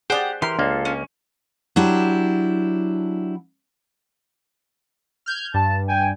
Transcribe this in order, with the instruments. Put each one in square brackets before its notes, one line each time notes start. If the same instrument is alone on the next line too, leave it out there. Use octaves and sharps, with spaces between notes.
[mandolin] G4 F#5 [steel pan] G#4 D5 [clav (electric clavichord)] C5 G5
[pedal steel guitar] E3 G4 A#4 [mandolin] C6
[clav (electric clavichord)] C#2 A#3 [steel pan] D4 [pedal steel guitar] F4 A4
[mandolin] C#4
[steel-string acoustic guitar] F#3 D4 E4 G4
[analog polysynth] F6 G6 G#6
[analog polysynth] G2 [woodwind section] A5
[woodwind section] G5 G#5